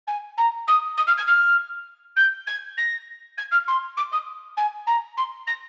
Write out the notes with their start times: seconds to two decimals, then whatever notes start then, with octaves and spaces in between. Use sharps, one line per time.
0.07 G#5
0.37 A#5
0.67 D#6
0.97 D#6
1.07 F6
1.17 G#6
1.27 F6
2.16 G6
2.46 G#6
2.77 A#6
3.37 G#6
3.51 F6
3.67 C6
3.97 D6
4.11 D#6
4.57 G#5
4.86 A#5
5.17 C6
5.47 A#6